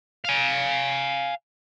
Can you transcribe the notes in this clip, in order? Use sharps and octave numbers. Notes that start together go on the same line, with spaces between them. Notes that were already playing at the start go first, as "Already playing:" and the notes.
F5 G#5